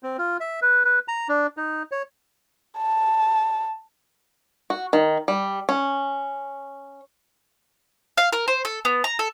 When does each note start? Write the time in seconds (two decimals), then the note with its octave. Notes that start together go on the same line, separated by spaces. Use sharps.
0.03 C4
0.18 F4
0.40 E5
0.62 B4
0.85 B4
1.08 A#5
1.29 D4
1.57 D#4
1.92 C#5
2.78 A5
4.70 F#4
4.93 D#3
5.28 G3
5.69 C#4
8.17 F5
8.33 A#4
8.48 C5
8.65 A4
8.85 B3
9.04 A#5
9.19 A4